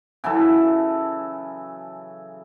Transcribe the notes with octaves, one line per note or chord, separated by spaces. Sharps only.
C#3 E3 F#3 A4